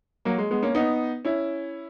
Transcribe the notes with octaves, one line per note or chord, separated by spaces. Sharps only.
F#3 A#3
G#3
G#3 B3
A#3 C#4
B3 D#4
C#4 E4